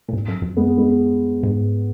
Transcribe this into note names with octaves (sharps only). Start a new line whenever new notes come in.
A#2
G#2
F#2
F#2
G#3 B3
G#3 B3
G#2